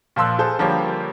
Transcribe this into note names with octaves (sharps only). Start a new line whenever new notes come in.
A#2 F3 C6 E6 F#6
G#4 A4 C5
D3 F3 G3 A#3 G4 C#5